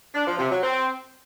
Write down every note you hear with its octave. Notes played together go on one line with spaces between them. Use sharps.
D4
F3
C3
F#3
C4